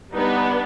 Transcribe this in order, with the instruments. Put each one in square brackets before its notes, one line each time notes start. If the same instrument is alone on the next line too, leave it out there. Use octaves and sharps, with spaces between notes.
[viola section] G3 B3 D4 D#4